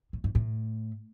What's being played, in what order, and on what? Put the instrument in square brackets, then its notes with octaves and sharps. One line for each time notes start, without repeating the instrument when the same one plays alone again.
[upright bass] A2
G#2
A2